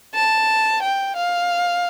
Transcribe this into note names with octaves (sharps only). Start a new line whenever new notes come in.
A5
G5
F5